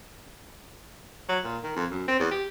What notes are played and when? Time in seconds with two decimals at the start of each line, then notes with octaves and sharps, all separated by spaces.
1.29 F#3
1.44 A#2
1.63 D#3
1.76 F2
1.91 F#2
2.08 C4
2.19 E2
2.31 G4